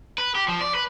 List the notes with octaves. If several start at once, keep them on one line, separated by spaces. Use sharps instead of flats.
B4
G4
F3
D5
B4